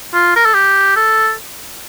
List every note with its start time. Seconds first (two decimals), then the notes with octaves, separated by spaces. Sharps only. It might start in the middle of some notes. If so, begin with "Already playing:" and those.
0.14 F4
0.36 A#4
0.46 A4
0.54 G4
0.97 A4